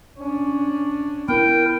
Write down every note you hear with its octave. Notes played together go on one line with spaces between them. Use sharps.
C#4 D4
B3 E4 A#4 G5